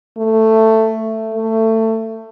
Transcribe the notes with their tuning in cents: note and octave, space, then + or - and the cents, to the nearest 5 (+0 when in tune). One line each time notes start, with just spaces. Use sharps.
A3 +10
A3 +20